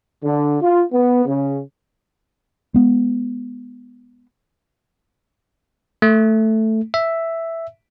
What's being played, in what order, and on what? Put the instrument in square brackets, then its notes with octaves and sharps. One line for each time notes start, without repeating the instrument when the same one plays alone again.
[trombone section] D3
F4
B3
C#3
[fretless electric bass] G#3 B3
[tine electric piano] A3
E5